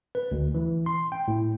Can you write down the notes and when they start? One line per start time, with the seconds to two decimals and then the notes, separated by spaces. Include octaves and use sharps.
0.15 B4
0.32 D2
0.54 E3
0.86 C6
1.12 G5
1.28 A2